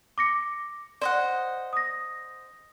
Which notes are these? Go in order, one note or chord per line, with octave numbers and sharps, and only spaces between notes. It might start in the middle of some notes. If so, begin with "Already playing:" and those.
D6 A#6 C#7
C5 D5 D#5 F#5
D#6 A#6